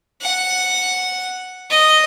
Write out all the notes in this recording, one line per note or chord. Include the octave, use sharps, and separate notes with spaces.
F#5
D#5